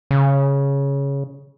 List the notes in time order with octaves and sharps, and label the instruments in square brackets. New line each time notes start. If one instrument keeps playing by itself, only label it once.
[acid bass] C#3